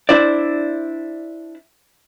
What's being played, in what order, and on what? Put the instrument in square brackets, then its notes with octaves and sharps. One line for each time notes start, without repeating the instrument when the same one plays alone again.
[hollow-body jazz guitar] D4 E4 C5 D5